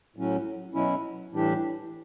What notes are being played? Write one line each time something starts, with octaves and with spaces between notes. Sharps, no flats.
A2 F#3 C#4
B2 F#3 C#4 E4
A2 E3 G3 D4 G4